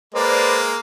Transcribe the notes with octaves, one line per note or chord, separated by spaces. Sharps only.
G#3 A#3 B4 C5 D5